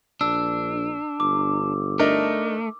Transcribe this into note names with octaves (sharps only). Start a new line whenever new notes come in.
A#1 D4 E6
G1 D6
A3 D4 D#4 A#4